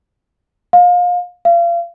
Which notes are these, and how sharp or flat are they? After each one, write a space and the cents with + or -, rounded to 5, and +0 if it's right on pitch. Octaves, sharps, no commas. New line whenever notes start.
F5 +30
F5 -35